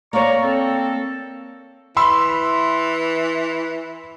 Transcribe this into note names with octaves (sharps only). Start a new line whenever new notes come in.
A#3 C#5 D5 A#5 C#6
C4 A4
E3 B5 C6 E6